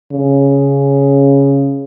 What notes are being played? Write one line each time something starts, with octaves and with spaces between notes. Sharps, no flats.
C#3